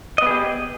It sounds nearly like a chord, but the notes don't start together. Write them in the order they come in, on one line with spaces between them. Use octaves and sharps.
D#5 B3 G#4 G4